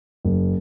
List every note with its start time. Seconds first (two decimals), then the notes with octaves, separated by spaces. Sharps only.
0.25 F#1